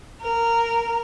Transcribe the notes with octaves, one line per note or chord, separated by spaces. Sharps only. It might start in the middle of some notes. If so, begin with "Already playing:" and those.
A#4